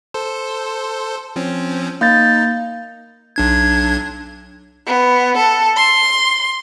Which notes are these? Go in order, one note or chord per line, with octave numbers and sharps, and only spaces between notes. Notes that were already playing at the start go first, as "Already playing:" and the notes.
A4 C5
F3 C4 C#4
A#3 D#4 G6 A6
B1 D4 G#6
B3
A4
C6